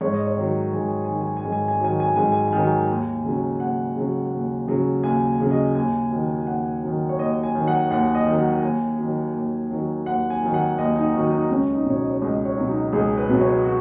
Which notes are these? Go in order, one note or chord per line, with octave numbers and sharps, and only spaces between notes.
G#2 C#5
D#5
C#5
D#3 F#3
G#2 G#5
G#5
G#5
D#3 F#3
G#5
G#5
G#2
G#5
G#5
D#3 F#3 G#5
G#5
G#2 G#5
G#5
G#5
D#3 F#3
G#5
D#2
C#3 F#3
D#2 F#5
C#3 F#3
D#2
C#3 F#3
D#2 G#5
C#3 F#3
D#5
D#2 G#5
D#3 F#3
D#2 F#5
D#3 F#3
C#5
D#2 D#5
G#5
D#3 F#3
F#5
D#2 F#5
D#5
D#3 F#3
F#5
D#2 G#5
D#3 F#3
D#2
D#3 F#3
D#2 F#5
G#5
D#3 F#3
F#5
D#2 D#5
D#4
D#3 F#3 F#4
D#4
C#2 C#4
D#4
B2 F#3 C#5
D#5
C#5
C#2 D#5
C#5
B2 F#3
D#4
C#2 G#4
B4
B2 F#3
C#5
F#4